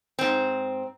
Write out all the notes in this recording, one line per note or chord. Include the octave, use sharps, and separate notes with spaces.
G#2 C4